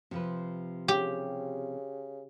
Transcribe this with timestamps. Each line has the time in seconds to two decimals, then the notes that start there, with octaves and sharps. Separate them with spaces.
0.11 C3 F3 B4
0.88 C#3 G4